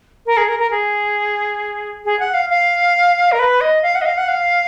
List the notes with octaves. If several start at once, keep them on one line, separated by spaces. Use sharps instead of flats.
A#4
G#4
A#4
A#4
G#4
G#4
F#5
F5
F5
A#4
B4
D#5
F5
F#5
D#5
F5
F#5
F5